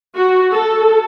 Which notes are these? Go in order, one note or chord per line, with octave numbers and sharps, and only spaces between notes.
F#4
A4